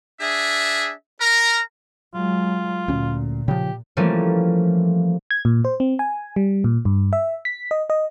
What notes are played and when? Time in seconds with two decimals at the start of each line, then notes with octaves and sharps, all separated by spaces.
0.21 D4 G#4 E5
1.20 A#4 A#5
2.14 F#3 G#3 F4
2.88 D2 A#2 C#4
3.48 C#3 F3 G4
3.97 E3 F3 G3 A3 A#3 C#4
5.31 G#6
5.45 A#2
5.65 C5
5.80 C4
5.99 G#5
6.36 G3
6.64 A#2
6.85 G2
7.13 E5
7.45 B6
7.71 D#5
7.90 D#5